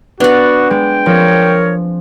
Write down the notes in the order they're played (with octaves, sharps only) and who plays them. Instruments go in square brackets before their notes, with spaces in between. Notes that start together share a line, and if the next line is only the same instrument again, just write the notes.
[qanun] B3 D5 [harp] D4 [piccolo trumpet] F#4
[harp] G#3 [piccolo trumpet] G5
[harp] F3 C4 [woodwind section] A#4 C#5